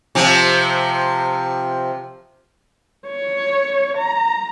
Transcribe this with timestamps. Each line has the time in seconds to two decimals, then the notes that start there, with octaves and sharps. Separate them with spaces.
0.15 C3 F3
3.07 C#5
3.97 A#5